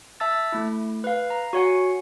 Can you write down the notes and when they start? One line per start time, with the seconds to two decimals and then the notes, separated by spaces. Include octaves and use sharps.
0.20 E5 A5 E6 A6
0.52 A3 E4
1.04 B4 F5
1.30 A#5
1.53 F#4 C#5 F#5 G#5